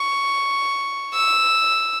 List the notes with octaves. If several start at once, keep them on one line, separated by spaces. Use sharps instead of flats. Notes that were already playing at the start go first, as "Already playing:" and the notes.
Already playing: C#6
E6